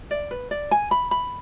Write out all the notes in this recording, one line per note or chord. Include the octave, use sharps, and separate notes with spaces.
D5
B4
D5
G#5
B5
B5